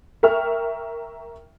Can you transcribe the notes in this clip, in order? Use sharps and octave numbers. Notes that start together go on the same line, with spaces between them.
A#4 E5 G5 C#6 F6